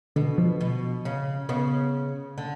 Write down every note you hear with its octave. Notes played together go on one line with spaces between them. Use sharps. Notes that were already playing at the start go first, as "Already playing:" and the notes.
B2 D3
F3
B2
C#3
C#3 B3
D3